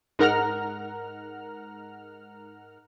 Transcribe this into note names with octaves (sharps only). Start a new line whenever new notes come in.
G#2 D#4 A#4 F#5 A#5 F6